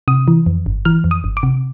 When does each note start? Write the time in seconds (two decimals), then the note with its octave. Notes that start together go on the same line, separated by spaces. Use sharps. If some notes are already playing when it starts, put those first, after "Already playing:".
0.08 C3 D#6
0.28 E3
0.46 F2
0.66 G1
0.85 E3 F6
1.04 F2
1.11 D#6
1.24 G1
1.37 D6
1.43 C3